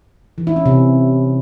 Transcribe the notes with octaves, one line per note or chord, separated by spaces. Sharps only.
E3
E4
C#4
C3